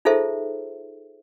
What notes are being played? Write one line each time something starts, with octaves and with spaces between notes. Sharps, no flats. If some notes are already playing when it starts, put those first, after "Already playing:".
D#4 F4 G#4 A4 C5 E5